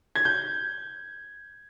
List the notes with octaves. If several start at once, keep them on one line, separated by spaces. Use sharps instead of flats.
G#6
G6